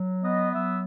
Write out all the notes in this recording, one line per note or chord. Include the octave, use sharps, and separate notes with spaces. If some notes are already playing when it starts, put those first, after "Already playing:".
Already playing: F#3
B3 D#5
F#3 E5